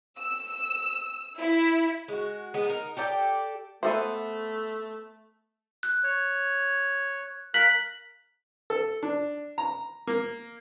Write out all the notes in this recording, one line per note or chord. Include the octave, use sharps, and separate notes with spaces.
E6
E4
G#3 F#4
G#3 B3
D#4 A#4
G4 A4 D5 G5
A3 B3 A4 C5 E5
F#6
C#5
A#4 F5 F#6 B6 F#7
A4
D4
A#5
A#3